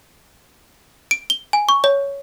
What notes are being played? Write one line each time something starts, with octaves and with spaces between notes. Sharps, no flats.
D7
G7
G#5
C#6
C#5